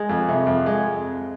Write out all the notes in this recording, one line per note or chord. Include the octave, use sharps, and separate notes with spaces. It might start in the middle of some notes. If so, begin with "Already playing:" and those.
Already playing: G#3
F2
C3
F2
G#3